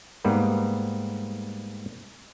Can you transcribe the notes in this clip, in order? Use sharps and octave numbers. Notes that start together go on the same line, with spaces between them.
G#2 G3 A#3 B3